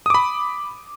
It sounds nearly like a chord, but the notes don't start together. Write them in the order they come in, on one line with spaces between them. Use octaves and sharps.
D#6 D6 B5